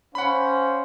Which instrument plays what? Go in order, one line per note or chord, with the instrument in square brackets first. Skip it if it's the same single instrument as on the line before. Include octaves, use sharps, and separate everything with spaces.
[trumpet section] C#4 C5 F5 [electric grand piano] F#5 B5